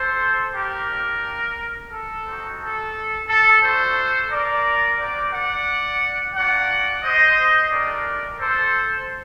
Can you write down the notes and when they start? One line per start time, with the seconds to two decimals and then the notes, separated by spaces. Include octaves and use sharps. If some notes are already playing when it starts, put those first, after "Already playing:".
Already playing: A4 C5
0.55 G4 A#4
0.90 A#3 D4 G4
1.91 A4
2.26 C4 D#4 F#4
2.60 A4
3.28 A4
3.62 A3 D4 F#4 A4 C5
4.31 A#4 D5
4.98 C4 F#4 A#4 D5
5.33 D5 F#5
6.35 A#3 D4 F#4 D5 F#5
7.03 C5 D#5
7.71 A3 D4 G4 A#4 D5
8.40 A4 C5